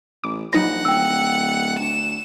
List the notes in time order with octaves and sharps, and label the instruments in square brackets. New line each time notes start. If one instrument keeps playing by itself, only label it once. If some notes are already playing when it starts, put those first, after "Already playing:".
[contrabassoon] A1 [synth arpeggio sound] D6
[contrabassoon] A#1 [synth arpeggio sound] F#3 D#4 B5 [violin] F#5 [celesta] A#6
[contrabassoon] D1 [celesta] G5 E6
[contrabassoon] D2 [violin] E7